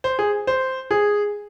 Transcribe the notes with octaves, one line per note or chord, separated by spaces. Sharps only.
C5
G#4
C5
G#4